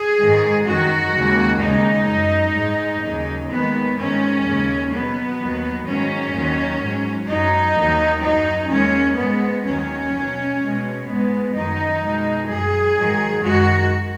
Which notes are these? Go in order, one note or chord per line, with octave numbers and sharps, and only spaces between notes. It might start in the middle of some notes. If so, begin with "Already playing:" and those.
Already playing: G#4
G#2 D#3 G#3
F#2 D#3 F#3 F#4
D#2 C#3 G#3
D#2 C#3 G#3 D#4
F#2 F#3
G#2 G#3
D#2 C#3 F#3
D#2 D#3 G#3 B3
G#2 D#3 G#3 C#4
D#2 C#3 G#3
B2 F#3 B3
D#2 D#3 F#3
G#2 D#3 F#3 C#4
D#2 D#3 F#3
G#2 F#3
F#2 F#3 D#4
D#2 D#3 F#3
F#2 F#3 D#4
D#2 D#3 G#3 C#4
G#2 G#3 B3
D#2 D#3 F#3 C#4
B2 F#3
B2 G#3
G#2 G#3 B3
F#2 D#3 F#3 D#4
B2 G#3
F#2 F#3 G#4
G#2 D#3 F#3
F#2 D#3 G#3 F#4